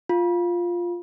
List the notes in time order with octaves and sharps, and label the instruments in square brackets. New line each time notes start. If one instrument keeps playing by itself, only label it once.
[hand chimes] F4